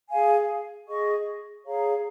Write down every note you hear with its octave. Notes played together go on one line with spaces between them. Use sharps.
G#4 F5 G#5
G#4 D#5 C#6
G#4 C#5 F5 A#5